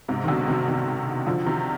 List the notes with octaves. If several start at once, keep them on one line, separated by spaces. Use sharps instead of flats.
G#2 C3
D#3
B2 D3
C3 D#3
C3 D#3
D3 F3
C3 D#3